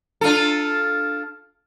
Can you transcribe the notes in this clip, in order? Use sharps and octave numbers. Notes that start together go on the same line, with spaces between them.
D4 F4 A4